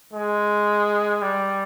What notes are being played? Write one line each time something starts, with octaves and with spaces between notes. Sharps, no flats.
G#3
G3